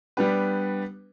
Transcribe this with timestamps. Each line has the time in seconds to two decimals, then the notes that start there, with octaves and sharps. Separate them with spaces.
0.17 G3 B3 D4 G4 B4